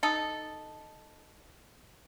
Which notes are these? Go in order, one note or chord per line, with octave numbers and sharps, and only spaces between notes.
D#4 A4